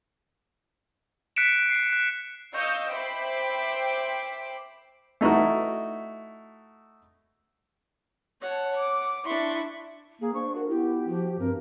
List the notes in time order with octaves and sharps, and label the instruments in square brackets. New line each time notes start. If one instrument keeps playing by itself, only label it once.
[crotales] F#6 B6 C#7 D7 E7
C7 C#7
F#6
[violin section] D#5 F5 C#6 E6 G6
C5 E5 G5 B5 D6 C7
[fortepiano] A3 D#4 E4 F#4
[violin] C#5 A5 [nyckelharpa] F#5
[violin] D6
[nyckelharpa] D4 C6 [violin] E4 C#6
[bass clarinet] A#3 [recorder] G#4
[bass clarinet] D4 [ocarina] C5 [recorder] C#6
[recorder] F#4 [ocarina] A#4
[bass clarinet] B3 [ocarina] E4 [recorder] G4
[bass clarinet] F3 [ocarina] F#4
[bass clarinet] G2 [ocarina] C4 [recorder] A#4